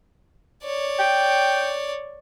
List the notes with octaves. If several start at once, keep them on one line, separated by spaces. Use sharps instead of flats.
C#5 D5
G5